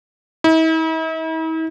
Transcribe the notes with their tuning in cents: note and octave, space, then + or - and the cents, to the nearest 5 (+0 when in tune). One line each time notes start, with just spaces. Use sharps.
E4 -45